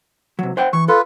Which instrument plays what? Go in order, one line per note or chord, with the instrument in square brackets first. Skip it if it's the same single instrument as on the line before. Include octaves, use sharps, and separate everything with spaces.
[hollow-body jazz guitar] C3 F#3
C5 F#5 G5
[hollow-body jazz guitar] E3 [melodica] C#6
[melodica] F4 B4 [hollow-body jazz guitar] A4